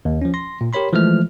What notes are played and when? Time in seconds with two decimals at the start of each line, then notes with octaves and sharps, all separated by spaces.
0.05 D#2
0.22 F3 C#4
0.34 C6 A#6
0.61 A#2
0.73 G4 A#4 C#5 B5 C6
0.93 E3 F3 G#3 A3 F6